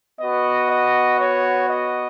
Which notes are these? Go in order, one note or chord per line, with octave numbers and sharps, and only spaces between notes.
B3 F#4 D#5
D#5
C#5
D#5